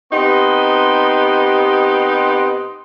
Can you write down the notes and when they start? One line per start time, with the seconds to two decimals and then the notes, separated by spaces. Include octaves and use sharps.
0.12 C3 B3 D#4 G4 D#5 C6